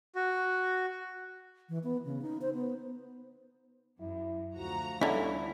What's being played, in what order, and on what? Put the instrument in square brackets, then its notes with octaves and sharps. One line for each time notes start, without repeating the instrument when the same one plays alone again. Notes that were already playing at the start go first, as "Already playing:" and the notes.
[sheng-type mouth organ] F#4
[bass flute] E3
B3
C#3
D#4
C5
B3
[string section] F#2 [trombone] E4
[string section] D2 F#4 A#5 [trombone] F3
[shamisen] D3 C#4 [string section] G3 [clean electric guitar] E4